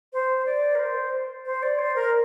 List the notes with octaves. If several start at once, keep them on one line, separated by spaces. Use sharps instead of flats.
C5
D5
A#4
C5
C5
D5
C5
A#4